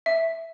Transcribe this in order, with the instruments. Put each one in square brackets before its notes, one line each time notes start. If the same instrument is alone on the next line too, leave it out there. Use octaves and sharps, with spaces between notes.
[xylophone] E5